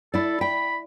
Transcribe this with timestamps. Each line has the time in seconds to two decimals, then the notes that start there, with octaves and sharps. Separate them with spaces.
0.14 E4 A4 D5
0.41 G5 B5